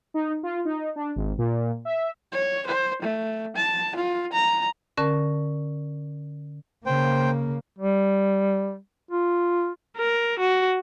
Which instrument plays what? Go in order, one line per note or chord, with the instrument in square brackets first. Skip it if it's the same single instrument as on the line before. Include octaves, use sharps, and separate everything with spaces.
[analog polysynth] D#4
F4
D#4
D4
G#1
A#2
E5
[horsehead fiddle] C#5
C5
A3
A5
F4
A#5
[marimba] D3 C#4 A#4 A5
[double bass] C#3 A#3 [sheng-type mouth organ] C5 G5
[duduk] G3
F4
[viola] A#4
F#4